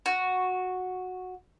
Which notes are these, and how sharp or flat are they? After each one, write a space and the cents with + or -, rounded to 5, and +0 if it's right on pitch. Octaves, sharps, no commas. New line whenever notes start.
F#4 -10 C#6 +0